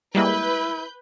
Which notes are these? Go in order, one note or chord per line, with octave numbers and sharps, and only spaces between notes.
G3 G#3 A#3 E4 B4 G6